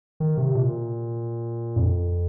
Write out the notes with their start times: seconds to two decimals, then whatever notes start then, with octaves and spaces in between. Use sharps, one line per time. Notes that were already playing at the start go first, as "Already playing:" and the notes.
0.20 D#3
0.37 C3
0.55 A#2
1.76 F2